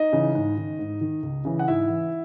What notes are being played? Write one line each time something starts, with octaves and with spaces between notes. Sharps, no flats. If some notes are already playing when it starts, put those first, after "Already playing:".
Already playing: D#4 D#5
C#3 E3
G#2
D#3
G#2
D#3
C#2
C#3 E3
F#5
G#2 E4 E5
E3